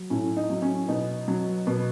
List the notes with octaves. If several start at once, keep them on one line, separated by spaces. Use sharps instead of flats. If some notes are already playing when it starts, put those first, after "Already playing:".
Already playing: F#3
A2 C#4
D#4
F#3
C#4
B2 D#4
F#3
B2